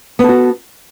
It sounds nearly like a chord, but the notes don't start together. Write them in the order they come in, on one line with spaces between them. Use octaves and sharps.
B3 A4 F#4